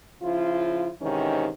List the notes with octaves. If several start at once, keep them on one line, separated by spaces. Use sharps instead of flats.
C#3 F3 E4 F4
G#2 C3 D#3 E3 C#4 D#4